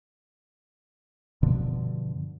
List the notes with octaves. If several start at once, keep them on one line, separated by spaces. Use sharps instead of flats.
G2 B2 D3 F3